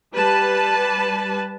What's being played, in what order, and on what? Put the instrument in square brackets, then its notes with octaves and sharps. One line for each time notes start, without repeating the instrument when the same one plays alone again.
[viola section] G3 B4 A5